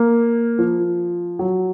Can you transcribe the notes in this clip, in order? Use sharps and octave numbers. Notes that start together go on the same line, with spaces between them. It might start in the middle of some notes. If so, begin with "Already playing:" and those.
Already playing: A#3
F3
F#3